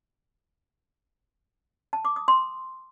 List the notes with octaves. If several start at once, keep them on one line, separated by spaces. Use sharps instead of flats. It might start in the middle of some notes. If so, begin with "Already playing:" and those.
A5
D6
D#6
C6